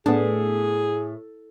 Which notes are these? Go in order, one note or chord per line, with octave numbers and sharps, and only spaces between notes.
A2 B3 D4 G#4